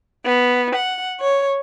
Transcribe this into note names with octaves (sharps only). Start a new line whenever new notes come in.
B3
F#5
C#5